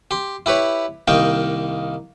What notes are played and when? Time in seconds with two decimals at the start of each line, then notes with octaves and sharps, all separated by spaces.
0.11 G4 C6
0.46 E4 G4 B4 C#5
1.07 C2 D#3 A#3 D#4 G5